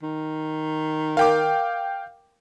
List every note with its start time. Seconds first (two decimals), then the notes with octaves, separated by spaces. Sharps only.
0.02 D#3
1.17 A#4 F5 G5 D6